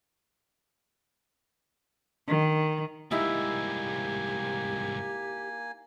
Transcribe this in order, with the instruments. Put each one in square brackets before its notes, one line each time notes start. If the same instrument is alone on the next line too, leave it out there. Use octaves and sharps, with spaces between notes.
[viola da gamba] D#3
[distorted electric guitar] C2 G#2 [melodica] A#3 G#5 [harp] D#4 E4 [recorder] G4